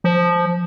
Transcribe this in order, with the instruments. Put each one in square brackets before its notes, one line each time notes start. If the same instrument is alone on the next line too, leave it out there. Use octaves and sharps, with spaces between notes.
[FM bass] F3